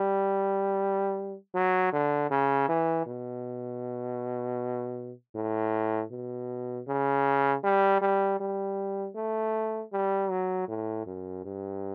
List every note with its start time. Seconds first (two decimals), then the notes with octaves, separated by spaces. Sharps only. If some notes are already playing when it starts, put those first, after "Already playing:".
Already playing: G3
1.54 F#3
1.92 D3
2.30 C#3
2.69 E3
3.06 B2
5.35 A2
6.11 B2
6.88 C#3
7.64 G3
8.01 G3
8.40 G3
9.16 A3
9.93 G3
10.30 F#3
10.68 A2
11.07 F#2
11.45 G2